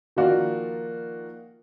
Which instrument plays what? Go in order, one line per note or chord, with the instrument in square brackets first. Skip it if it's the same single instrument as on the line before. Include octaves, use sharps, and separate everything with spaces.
[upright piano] D#3 F3 A#3 F4 F#4 D5